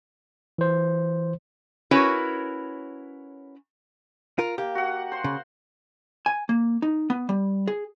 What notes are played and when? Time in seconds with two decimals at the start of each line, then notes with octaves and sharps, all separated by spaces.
0.58 E3 C5
1.91 C#4 E4 F#4 A#4 B4 C#5
4.38 F4 A#4
4.58 A#3 G4
4.75 F#4 F#5
5.12 C5 C6
5.24 C#3
6.26 G#5
6.49 A#3
6.82 D#4
7.10 B3
7.29 G3
7.68 G#4